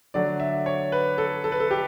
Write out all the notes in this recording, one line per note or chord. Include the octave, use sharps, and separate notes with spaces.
D3 F#3 A3 D5
E5
C#5
B4
A4
A4
B4
A4
G4